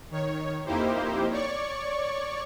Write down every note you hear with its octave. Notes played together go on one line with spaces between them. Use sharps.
D#3 C#5
F2 A#3 D#4 E4 G4 C5
C#5 D5 C#6